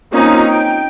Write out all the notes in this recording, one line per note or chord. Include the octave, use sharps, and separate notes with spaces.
A#3 C4 C#4 D#4 F4
G5